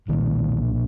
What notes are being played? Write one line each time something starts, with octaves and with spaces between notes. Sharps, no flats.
B1 A#2 D#3